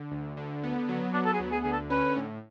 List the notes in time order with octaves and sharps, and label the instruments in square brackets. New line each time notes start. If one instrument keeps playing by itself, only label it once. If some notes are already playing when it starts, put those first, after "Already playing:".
Already playing: [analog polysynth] D3
D2
D3
B3
F#3
[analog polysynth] B3 [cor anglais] D4
[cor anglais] A4
G#4
[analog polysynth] D2
[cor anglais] G#4
[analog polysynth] D3 [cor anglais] G#4
[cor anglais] A4
[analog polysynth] C#4 [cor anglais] B4
[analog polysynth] A2